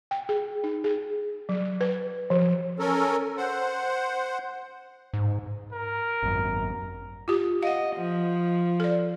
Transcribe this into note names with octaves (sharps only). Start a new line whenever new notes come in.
G5
G#4
D#4
G#4
F#3
B4
F3
C#4 A4 A#4
C5 F#5
G#2
A#4
G#1 F#2
F4 G4
D#5 F5 F#5
F3
A4 D5